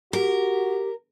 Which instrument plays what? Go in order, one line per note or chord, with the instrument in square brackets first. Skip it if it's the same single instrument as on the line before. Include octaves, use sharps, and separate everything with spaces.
[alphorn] F#4 [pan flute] G4 [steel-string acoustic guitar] A#4